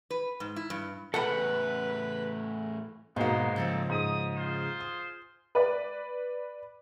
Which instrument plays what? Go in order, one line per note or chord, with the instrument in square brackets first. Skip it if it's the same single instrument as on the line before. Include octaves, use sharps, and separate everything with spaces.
[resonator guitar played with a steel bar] B4
G#2
E4
G2
[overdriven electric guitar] E2 A2 [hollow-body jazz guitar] A4 F#5 B5 [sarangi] B4
[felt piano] G#2 A#3 [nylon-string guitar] B2 F#4 [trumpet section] G#3 B3 C6
[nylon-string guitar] C#3 F3 G#3 [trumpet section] C4 A4
[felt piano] G#2 [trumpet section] D#6
[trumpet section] F4 G#4 C5
[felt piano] D#6
[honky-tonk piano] B4 D5